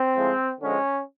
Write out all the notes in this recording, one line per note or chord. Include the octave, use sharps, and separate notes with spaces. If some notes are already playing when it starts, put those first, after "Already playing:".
Already playing: C4
A2 F3 G#3
D3 F3 G#3 C#4